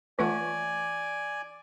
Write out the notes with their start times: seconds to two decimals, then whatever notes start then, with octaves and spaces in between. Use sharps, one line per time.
0.19 E3 A3 F4 B4 D5 F#5 G#5